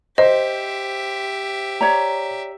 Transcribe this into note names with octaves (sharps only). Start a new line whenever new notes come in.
G4 C5 D#5 E5
C#5 D5 A#5